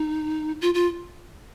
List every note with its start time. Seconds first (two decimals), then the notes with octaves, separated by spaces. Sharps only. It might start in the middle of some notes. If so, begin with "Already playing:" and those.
Already playing: D#4
0.61 F4
0.74 F4